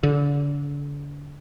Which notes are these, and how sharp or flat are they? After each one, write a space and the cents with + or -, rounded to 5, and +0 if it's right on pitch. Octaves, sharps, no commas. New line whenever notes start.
D3 -35